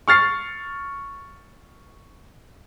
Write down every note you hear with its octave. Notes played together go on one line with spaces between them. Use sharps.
C#6 F6 A6 C7